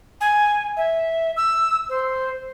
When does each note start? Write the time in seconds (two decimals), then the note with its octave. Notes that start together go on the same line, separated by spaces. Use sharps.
0.21 G#5
0.77 E5
1.37 E6
1.89 C5